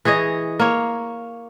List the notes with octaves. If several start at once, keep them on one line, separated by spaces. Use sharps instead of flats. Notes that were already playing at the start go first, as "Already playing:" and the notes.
E3 G#4 C#5 D#5
A#3 C#5